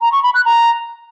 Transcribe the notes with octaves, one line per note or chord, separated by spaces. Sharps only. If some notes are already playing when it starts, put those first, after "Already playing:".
A#5
C#6
B5
F#6
A#5